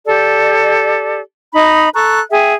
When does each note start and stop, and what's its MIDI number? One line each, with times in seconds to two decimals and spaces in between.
0.06 1.21 67
0.06 1.21 69
0.06 1.21 74
1.53 1.89 63
1.53 1.89 75
1.53 1.89 83
1.94 2.20 69
1.94 2.20 82
1.94 2.20 85
1.94 2.20 90
2.31 2.54 68
2.31 2.54 76
2.31 2.54 79